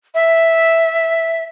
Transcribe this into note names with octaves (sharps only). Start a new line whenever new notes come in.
E5